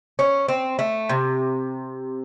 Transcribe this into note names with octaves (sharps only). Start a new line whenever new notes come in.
C#4
C4
A3
C3